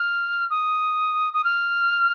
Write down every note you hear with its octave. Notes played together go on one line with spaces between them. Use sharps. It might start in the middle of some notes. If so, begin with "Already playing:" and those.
Already playing: F6
D#6
D#6
F6